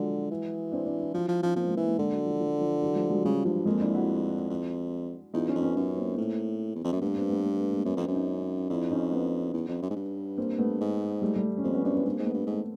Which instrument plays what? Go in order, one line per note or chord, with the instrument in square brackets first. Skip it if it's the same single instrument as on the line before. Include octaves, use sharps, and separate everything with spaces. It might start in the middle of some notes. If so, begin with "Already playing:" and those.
Already playing: [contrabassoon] D3 [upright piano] F3 F#3 G#3
[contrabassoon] E3
[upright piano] C4 D4
C4 D4
D4 E4
[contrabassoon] F3 [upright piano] E4 F#4
[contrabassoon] F3
[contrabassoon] F3 [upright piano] C#4 D#4
[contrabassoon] F3 [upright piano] A#3 C4
[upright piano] G#3 A#3
[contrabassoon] E3
[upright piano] G#3 A#3
[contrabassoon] D3 [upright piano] G#3 A#3
[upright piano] F#3 G#3
F3
F3
F3
E3 F#3
F3 G3
F#3 G#3
[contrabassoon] C#3 [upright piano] F3 G3
[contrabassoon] G2 [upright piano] F3
[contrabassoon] F2 [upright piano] G#3 A#3
[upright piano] D4 E4
E4 F#4
[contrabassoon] F2
[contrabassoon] E2 [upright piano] D#4 F4
[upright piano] C#4 D#4
[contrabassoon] F2
[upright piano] B3 C#4
[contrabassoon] F#2 [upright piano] B3 C#4
[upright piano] A#3 C4
[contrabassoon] A2 [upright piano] A#3 C4
[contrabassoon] E2
F2
[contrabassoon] F#2 [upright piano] A#3
[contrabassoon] G2 [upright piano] A3 B3
[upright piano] A#3 C4
A3 B3
A3 B3
A3 B3
G#3 A#3
[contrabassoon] F#2 [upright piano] B3 C#4
[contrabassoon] F2 [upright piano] C4 D4
[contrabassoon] F#2
[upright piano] C#4 D#4
[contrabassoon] F2 [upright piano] D4 E4
[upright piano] C#4 D#4
B3 C#4
[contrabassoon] E2
F2
F#2
G#2
G2
[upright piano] A#3 C4
A3 B3
[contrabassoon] G#2
[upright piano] G3 A3
G3 A3
C#4
[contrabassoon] F2 [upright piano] A#3 C4
[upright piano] B3 C#4
[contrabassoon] F#2 [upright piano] C4 D4
[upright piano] B3 C#4
[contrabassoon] G2 [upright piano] A#3 C4
[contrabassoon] G#2
[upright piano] A3 B3
[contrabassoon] G2
[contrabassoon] G#2 [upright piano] A3 B3